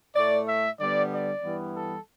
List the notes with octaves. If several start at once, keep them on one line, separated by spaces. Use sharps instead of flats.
A2 A3 D5
E5
D3 G3 B3 D5
D5
G2 E3 G3 B3
A4